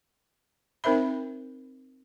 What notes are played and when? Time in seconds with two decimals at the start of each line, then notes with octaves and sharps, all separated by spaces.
0.84 C4 D#4 A#4 C5 E5 B5